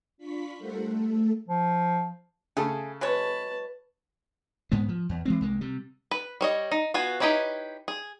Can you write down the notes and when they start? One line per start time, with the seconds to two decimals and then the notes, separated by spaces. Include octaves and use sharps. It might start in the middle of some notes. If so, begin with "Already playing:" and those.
0.18 D4 F4 B5 C#6 B6
0.58 G3 A3 A4 A#4 C5 F#5
0.89 A3 A4
1.48 F3
2.57 C#3 A3 G#4 A4
3.01 F#3 G#3 B4 C#5 A5
4.72 G#2 G#3 B3
4.89 F3
5.09 E2
5.25 E3 G#3 C4
5.41 C2 G#3 A#3
5.61 C3 G3
6.11 B4
6.41 G3 C#5 D#5
6.72 D#4
6.94 B3 F4 F#4 G#5
7.20 D#4 E4 G4 B4 C#5
7.88 G#4